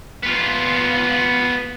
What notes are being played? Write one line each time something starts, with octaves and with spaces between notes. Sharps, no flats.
B3 F4